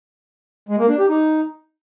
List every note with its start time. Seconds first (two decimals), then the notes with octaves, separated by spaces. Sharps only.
0.69 G#3
0.79 A#3
0.89 D4
0.99 G4
1.09 D#4